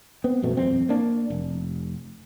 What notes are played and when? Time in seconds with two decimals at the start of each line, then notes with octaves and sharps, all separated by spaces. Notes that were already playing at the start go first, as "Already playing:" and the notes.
0.24 B3 C4
0.42 A#1 F#2 B2 A3
0.57 D#1 F2 C4
0.89 A#3 D4
1.30 F1